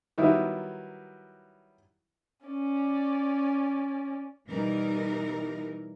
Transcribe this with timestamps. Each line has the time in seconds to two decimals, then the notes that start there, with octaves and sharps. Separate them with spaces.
0.18 D#3 F#3 G3 B3 E4
2.46 C#4 D5
4.48 B2 E3 G3 D#4 A#4